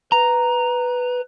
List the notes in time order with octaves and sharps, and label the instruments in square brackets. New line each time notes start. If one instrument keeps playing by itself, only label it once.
[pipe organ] B4 [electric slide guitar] A#5